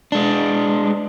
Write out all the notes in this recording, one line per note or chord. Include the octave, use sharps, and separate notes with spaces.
G#3 D4